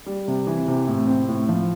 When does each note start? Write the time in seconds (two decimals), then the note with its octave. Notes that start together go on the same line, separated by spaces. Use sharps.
0.06 G3
0.28 C3
0.47 E3
0.68 C3
0.88 A2
1.07 C4
1.28 A2
1.49 F3